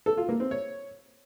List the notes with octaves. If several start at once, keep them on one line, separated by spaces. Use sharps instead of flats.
A4
F4
A#3
C4
C#5